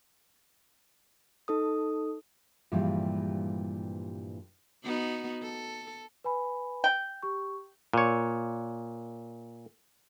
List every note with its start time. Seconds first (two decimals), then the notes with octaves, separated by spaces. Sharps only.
1.48 D#4 A4 D#6
2.72 G2 A#2 E3 F3 G3 G#3
4.84 B3 D#4 F#4
5.42 A4
6.24 B4 G#5 B5
6.84 G5
7.23 G4 C#6
7.94 A#2 C#5